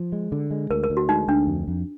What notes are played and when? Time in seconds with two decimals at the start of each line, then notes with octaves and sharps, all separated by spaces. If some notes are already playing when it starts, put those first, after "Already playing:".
Already playing: F3
0.12 G#3
0.32 D3
0.51 G#3
0.71 D2 A#4
0.84 A#4
0.90 D2
0.97 F#4
1.09 G#3 D#4
1.28 D2 D4
1.47 F2
1.68 F2